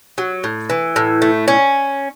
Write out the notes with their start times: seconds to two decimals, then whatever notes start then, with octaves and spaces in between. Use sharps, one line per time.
0.18 F#3
0.44 A2
0.70 E3
0.96 A2
1.22 A3
1.48 C#4